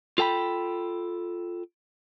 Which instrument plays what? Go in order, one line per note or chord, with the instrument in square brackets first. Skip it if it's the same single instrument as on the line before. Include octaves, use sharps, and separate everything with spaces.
[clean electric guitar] F4 A4 G5 G#5 B5